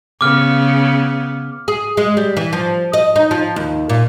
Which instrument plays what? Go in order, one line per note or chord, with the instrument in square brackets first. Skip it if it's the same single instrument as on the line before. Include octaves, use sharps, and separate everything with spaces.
[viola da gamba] C#3 B3 [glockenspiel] D6 F6
[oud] G#4
G#3
G3
E3
F3
D#5
D#4
F3
D#2
A#2